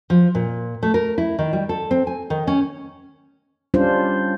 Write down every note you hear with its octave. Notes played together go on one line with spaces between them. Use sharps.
F3
A#2
A3
A#4
E4
D#3
G3
A4
C4
G#5
D#3
C#4
G3 C#4 D4 F4 C5